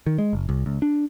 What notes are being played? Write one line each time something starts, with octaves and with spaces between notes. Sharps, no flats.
D#3
G#3
F#1
C2
C#2
D4